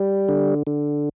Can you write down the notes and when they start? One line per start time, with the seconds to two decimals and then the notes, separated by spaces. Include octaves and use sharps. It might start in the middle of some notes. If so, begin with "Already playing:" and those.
Already playing: G3
0.29 D3
0.67 D3